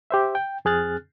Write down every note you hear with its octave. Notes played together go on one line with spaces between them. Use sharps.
G4 C5 E5
G5
F2 C4 G#4 F6 F#6 A6